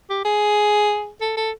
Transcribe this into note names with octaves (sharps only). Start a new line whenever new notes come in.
G4
G#4
A4
A4